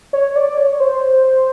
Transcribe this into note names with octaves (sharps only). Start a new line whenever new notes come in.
C#5
D5
C#5
C5